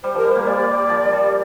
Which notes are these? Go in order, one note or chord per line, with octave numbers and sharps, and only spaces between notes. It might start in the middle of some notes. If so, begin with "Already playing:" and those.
G3 C5
F3 A#4
G3
A#3 C5
G3 D5
F3
G3